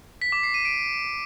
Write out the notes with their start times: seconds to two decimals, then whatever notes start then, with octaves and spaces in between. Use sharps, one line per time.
0.22 B6
0.32 D6
0.43 C7
0.54 D#7
0.65 D7